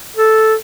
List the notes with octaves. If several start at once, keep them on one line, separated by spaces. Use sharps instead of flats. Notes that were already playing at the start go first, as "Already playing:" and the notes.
A4